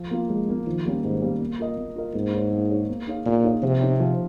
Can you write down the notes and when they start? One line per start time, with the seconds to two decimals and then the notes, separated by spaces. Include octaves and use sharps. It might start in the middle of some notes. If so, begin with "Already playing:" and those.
Already playing: F3
0.11 A#3 F4
0.29 F3 G#3
0.48 A#3 F4
0.66 D#3 F3
0.85 G3 A#3 C#4 G4
1.03 G#2 D#3
1.22 G3 A#3 C#4 G4
1.40 A#3
1.59 F4 A#4 D#5
1.77 A#3
1.96 F4 A#4 D#5
2.14 G#2 A#3
2.33 D#4 G#4 C#5
2.52 A#3
2.70 D#4 G#4 C#5
2.89 A#3
3.07 D#4 G#4 C#5 F5
3.26 A#2 A#3
3.44 D#4 G#4 C#5 F5
3.62 C3 F3
3.81 C4 D#4 G4 C#5
4.00 F3